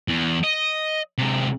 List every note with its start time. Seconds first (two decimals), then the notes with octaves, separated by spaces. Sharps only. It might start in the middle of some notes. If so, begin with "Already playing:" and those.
0.08 E2
0.43 D#5
1.18 C3 G#3